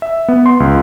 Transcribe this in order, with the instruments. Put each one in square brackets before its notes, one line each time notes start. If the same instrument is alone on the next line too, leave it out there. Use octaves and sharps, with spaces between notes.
[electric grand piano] E5
B3
C6
C#2